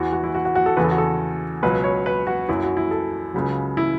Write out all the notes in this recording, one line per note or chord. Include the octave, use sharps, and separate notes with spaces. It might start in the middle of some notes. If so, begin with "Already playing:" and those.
Already playing: E2 E3 F#4
F#4
E4
F#4
F#4
F#4
A4
E2 C#3 E3 B4
A4
F#4
A4
C#2 B2 F#3 B4
C#5
B4
F#4
F#2 F#3 E4
F#4
E4
A4
C#2 C#3 F#3
E4